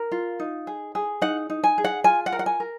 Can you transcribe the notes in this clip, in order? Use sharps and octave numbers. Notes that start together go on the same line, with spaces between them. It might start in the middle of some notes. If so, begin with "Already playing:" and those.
Already playing: A#4
F4
D#4
G#4
G#4
D#4 F#5
D#4
G#5
G#4
F#5
F4 G#5
F#5
A#4
F#5
G#5
A#4